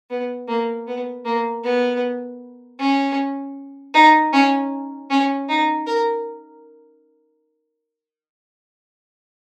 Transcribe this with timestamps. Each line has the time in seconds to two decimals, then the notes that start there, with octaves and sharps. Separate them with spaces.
0.10 B3
0.49 A#3
0.87 B3
1.25 A#3
1.64 B3
2.80 C#4
3.94 D#4
4.33 C#4
5.10 C#4
5.49 D#4
5.87 A#4